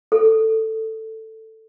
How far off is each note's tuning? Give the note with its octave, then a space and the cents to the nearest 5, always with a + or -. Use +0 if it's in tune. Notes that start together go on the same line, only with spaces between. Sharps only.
A4 +10